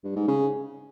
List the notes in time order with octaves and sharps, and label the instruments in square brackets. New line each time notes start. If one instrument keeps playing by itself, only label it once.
[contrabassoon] G2
G#2
C#3